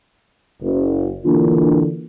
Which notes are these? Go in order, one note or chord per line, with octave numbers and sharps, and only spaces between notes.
F#1
D3 E3 A#3 D4 F4